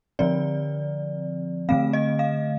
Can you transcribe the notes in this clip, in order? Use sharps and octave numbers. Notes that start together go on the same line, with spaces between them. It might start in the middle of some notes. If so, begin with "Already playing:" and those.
D3 F3 C4 D5
D3 A3 C4 F5
D#5
F5